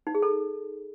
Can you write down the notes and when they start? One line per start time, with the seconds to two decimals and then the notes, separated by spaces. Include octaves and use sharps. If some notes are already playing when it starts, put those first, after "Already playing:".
0.07 D#4
0.15 G#4
0.23 A4